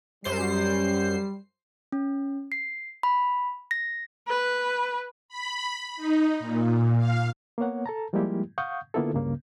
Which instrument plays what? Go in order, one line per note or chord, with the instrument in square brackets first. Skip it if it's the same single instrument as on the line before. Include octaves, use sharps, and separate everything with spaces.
[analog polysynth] F#2 C5 C7 [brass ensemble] G3
[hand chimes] C#4
C7
B5
A#6
[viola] B4
[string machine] B5
D#4
A#2
F5
[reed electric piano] A#3 B3 C#5 F#5
A4 A5 A#5
F3 G3 G#3 A#3 E4 G4
F5 F#5 C#6 D#6 G6
D3 A#3 B3 E4 F4 A4
C#2 G2 C#3 A#3